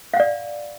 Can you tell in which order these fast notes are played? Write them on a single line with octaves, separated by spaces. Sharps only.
F5 F#5 D5